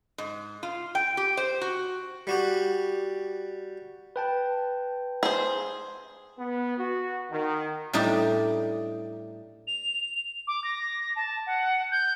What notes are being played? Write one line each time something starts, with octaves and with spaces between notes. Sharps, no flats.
G#2
F4
G5
G4
C5
F#4
G3 F#4 G4
B4 G5 A5
G#4 C5
B3
F#4
D#3
A2 G3 D4 D#4 G4
F7
D6
A#6
A5
F#5
G6